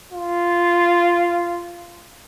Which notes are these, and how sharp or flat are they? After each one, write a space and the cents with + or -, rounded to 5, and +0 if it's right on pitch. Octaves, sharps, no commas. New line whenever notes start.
F4 -10